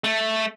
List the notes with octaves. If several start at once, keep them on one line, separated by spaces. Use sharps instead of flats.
A3